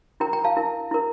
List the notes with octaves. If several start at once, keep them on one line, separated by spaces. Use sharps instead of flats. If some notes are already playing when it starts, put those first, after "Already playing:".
E4 A#4 G5 A#5
G5 A#5
F5 A5
E4 A#4
E4 A#4